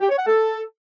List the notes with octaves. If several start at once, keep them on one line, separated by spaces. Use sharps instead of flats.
G4
C#5
F#5
A4